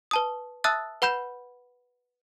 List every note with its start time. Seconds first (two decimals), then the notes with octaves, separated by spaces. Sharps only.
0.11 B4 A5 D#6
0.64 E5 A5 D#6 E6 F#6 A6
1.02 B4 F#5 B5 G6 E7